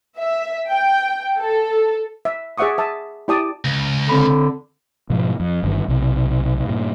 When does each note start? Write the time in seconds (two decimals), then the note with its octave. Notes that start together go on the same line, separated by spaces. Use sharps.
0.17 E5
0.68 G5
1.38 A4
2.25 E5
2.58 G#4 D5 E5 F#5 C#6 D#6
2.78 E5 A5 D#6
3.28 E4 G4 D5 A5 D#6
3.65 C#2
4.09 D3 C4 B5
5.10 G#2 B2 F3
5.40 F2
5.63 G1 G2 D#3 G3
5.88 B1 C3
6.65 G2 A#2